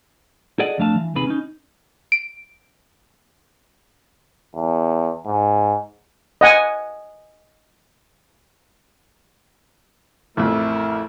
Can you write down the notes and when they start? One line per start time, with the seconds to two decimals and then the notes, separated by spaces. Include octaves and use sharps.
0.59 G#4 A4 D5 D#5 F#5
0.78 F2 F3 A3 D4 F5 A5
0.96 E3
1.15 D#2 C3 D#4 G#4 B4 B5
1.27 C#4 D#4
2.12 D7
4.55 E2
5.26 G#2
6.41 D#5 F#5 G#5
10.37 A1 F2 A3 E4 A#4